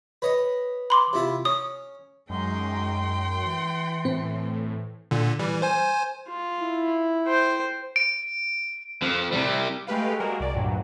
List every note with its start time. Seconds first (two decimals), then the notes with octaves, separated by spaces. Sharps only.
0.22 B4 C#5 D#5
0.90 B5 C6 D6
1.13 C3 E4 F4
1.45 C#4 D#6
2.30 F#2 G#3 D#4 G5 C6
3.43 E3
4.05 A2 C4
5.11 A#2 D3
5.39 E3 G3
5.62 C5 G#5
6.28 F4
6.62 E4
7.27 C5 G5
7.96 D7
9.02 F2 F3
9.32 C3 G3
9.87 G#3 A3 G4 B4 F5
10.20 G3 G#3 A#3 F#4 A#4
10.40 C2 D5
10.55 D2 G2 A#2 F#3